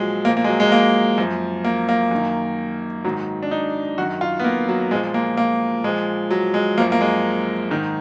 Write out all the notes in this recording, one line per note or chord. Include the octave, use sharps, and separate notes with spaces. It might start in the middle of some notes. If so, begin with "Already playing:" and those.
Already playing: A#2 F3 F#3 G#3
A#2 F3 A#3
A#3
G#3
F#3
G#3
A#3
F#2 F3
A#3
A#3
F#2 D#3
G#2 D#3 F#3
D4
D#4
F#2 D#3 F#4
F4
B3
A#3
F#3
A#2 F3 G#3
A#3
A#3
A#2 F3 G#3
F#3
G#3
F#2 F3 A#3
A#3
G#3
G#2 D#3